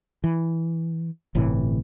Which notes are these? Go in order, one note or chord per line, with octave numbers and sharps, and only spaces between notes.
E3
G1 A2 C3 E3